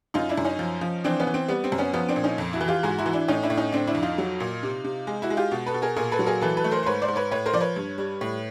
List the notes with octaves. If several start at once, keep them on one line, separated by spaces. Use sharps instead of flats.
F#2 D#4 F4
D4 E4
F#2
C#4 D#4
F3
F3
E3 C4 D4
B3 C#4
E3
C4
G3 B3
C4
F#2
B3 C#4
F3 B3 C#4
C4 D4
A#2
C#4 D#4
F2
E4 F#4
E3
F4 G4
G#2 F#4 G#4
E4 F#4
E3
D4 E4
A2 C#4 D#4
D4 E4
A2
C#4 D#4
D3 C4 D4
D4 E4
F2
D#4 F4
F#3
A#2
C3
C3
G#3
E4 F#4
G#3
F4 G4
B2
A4 B4
B2
G#4 A#4
A#2 G#4 A#4
A4 B4
F#3
G#4 A#4
E3 A4 B4
A4 B4
A3
A#4 C5
C5
G#2 B4 C#5
C5 D5
G#2
B4 C#5
A2 B4 C#5
A#4 C5
F3 D5
B4 C#5
G2
G3
A2